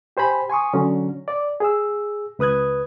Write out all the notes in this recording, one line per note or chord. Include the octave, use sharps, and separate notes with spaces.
G4 C5 G#5 B5
G#5 C6 C#6 D#6
D3 F#3 C#4
D5
G#4 E6
C#2 B4 D#6 F#6 G#6